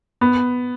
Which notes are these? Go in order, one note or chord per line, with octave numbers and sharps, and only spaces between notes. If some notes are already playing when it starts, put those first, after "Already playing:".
B3